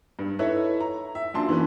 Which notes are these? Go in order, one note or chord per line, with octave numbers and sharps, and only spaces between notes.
G2
D#4 E4 A4 B4 C#5 E5
A#5
E5
A#1 F#2 D4 A5 C6
E3 A#3 C#4 B4